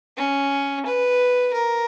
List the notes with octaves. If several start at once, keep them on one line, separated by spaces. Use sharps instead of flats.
C#4
B4
A#4